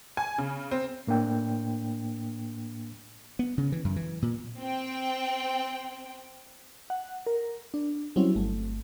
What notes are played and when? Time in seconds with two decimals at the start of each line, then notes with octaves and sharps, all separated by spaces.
0.17 G#5
0.38 C#3
0.71 C4
1.07 A2 A#3 D4 G5
3.39 B3
3.58 C#3
3.72 E3
3.85 F#2
3.96 E3
4.22 A#2
4.59 C4 G5
6.90 F#5
7.26 A#4
7.74 D4
8.16 F#3 G3 C4 C#4 E4
8.35 G1 A3